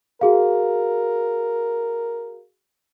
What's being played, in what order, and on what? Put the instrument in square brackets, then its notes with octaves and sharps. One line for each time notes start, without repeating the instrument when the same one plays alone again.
[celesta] F#4 G#4 F5 [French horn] A#4